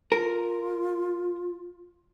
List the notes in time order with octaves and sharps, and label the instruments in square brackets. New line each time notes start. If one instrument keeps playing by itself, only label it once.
[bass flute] F4 [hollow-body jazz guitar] A#4